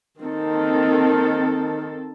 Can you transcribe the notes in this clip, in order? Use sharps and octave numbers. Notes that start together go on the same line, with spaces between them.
D#3 A#3 C4 A4